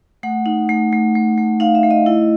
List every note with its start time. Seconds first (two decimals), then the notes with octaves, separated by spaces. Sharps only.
0.23 A3 F#5
0.46 D#4
0.69 A3
0.92 A3
1.15 A3
1.38 A3
1.60 D#4 F5
1.75 E5
1.83 A3
1.91 D#5
2.06 E4